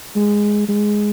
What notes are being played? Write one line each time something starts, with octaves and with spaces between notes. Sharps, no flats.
G#3
G#3